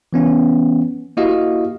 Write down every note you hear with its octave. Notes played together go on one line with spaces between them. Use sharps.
E3 B3 C#4
A#3 E4 F#4 G4 D#5 F5